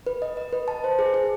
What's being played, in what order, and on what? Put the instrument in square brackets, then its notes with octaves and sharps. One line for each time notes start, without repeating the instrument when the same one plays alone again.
[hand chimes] B4
D#5
D#5
B4
A5
C5
G#4
G#4